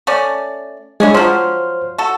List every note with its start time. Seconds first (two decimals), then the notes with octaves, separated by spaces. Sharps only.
0.07 A3 C#4 D5
1.00 E3 G#3 C#4 D4 G#4
1.14 F3 F#3 C5 C6 F6
1.98 F#4 A4